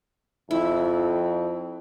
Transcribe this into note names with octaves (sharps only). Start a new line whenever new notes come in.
F2 E4